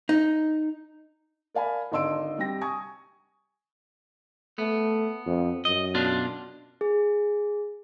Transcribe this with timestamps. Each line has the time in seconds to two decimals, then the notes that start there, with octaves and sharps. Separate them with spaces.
0.09 D#4
1.54 A#4 D5 F5 G#5 B5
1.92 G#1 D3 D#5 C6 E6 D7
2.37 C3 G3 G5 A#6
2.61 G#5 C#6 D#6 G#6
4.58 A3 B3
5.26 F2
5.65 F#2 D#5
5.95 B2 D4 F4
6.81 G#4